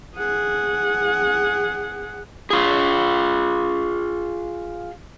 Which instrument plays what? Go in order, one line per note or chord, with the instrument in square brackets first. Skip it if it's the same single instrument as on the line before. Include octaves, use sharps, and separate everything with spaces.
[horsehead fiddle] G#4 F#5
[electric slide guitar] F4 G#4